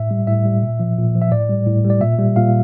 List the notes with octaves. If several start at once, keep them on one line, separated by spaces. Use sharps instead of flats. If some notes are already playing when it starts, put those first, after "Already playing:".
Already playing: A2 E5
G3
A2 E5
G3
A#2
F3
A#2
F3
E5
A2 D5
G3
A2
G3
D5
A#2 E5
G3
A#2 F5